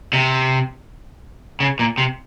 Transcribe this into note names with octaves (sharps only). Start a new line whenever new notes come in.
C3
C#3
A#2
C3